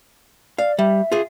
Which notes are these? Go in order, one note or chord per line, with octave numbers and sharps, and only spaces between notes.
D5 F5
G3 E5
F4 G#4